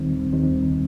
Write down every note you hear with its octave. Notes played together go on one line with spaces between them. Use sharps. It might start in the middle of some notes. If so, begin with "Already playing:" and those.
Already playing: D#2 D#3 G3 C4 D#4
D#2 D#3 G3 C4 D#4